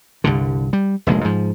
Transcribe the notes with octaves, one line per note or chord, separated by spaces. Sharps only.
C2 G2 D3
G3
F1 A#1 B2 G#3
G#2 F3